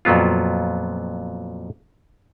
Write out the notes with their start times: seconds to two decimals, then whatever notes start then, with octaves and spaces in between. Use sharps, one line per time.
0.05 F2 A#2 F#3 B3 F4